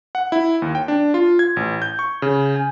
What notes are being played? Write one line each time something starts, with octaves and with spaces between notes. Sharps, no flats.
F#5
E4
D#2
G5
D4
F4
G#6
A1
G6
C#6
C#3
G#5